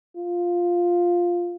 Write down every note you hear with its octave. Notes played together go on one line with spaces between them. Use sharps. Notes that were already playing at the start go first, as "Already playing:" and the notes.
F4